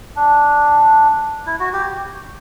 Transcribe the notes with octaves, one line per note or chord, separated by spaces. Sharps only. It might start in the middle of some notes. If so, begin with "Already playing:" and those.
D4
E4
F#4
G4